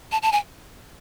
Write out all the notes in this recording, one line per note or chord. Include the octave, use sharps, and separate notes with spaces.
A5
A5
G#5